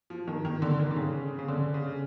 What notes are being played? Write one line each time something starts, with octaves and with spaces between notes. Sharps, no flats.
F3
D#3
D#3
D3
D#3
D3
C#3
C#3
D3
C#3